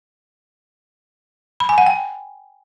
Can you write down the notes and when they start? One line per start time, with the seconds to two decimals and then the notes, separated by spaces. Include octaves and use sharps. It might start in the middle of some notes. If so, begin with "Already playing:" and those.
1.60 B5
1.69 G#5
1.78 F#5
1.86 G5